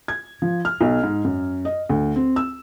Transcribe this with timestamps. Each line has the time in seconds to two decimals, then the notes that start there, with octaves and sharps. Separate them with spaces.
0.08 G#6
0.42 F3
0.65 F6
0.81 B1
1.03 G#2
1.25 F#2
1.65 D#5
1.89 D2
2.16 C4
2.36 E6